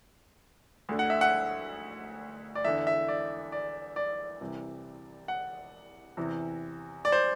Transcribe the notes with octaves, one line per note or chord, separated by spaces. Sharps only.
D2 D3
F#5
E5
F#5
D5
E2 D3 E5
E5
D5
D5
D5
C2 C3 E3
F#5
E2 C3 E3
D5
C5